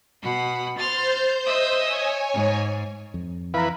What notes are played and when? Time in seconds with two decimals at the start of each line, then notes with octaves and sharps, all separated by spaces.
0.21 B2 F#5 B5
0.78 C5 C6 F6 G6 A6
1.44 D#5 E5 D#6
1.75 C#5 G#5
2.31 G#2
3.14 F2
3.54 E3 B4 F5 A#5